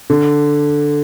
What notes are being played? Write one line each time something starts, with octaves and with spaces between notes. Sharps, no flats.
D3